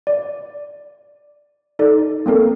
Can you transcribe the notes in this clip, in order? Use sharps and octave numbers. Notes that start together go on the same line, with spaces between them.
D5
D#4 A4 D5
A#3 C4 A4 A#4